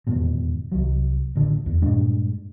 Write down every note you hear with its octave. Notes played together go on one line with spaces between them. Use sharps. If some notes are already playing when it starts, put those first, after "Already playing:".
D#1 E2 G#2 B2
C2 F#3
A1 D3
E2
G2 A#2 G#3 D4